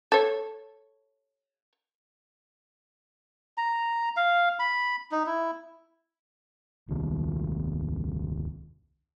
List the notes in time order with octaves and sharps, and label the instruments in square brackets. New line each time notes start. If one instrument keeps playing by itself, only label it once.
[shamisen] A4 C#5
[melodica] A#5
F5
B5
D#4
E4
[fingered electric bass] D#1 C2 D#3